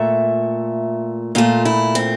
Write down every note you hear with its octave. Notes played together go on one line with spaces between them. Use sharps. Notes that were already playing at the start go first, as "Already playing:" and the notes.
Already playing: A#2 A3 E5
A#2 A3 F4
E4
C4